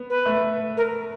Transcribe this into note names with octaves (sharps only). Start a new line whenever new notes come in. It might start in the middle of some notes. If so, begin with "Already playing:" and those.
Already playing: B3
B4
A3
A#4